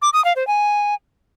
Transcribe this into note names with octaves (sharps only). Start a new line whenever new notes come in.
D6
D#6
F5
C5
G#5